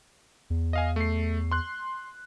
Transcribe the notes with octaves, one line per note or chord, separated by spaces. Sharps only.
E2
D#5 F5 G#5
A3 C7
C6 F#6